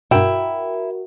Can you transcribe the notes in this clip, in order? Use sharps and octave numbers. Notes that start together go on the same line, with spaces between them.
G2 B2 E4 F#4 A#4 G5